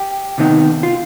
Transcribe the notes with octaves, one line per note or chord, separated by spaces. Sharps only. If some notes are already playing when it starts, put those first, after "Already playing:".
Already playing: G4
C3 D#3 B3 D#4
F4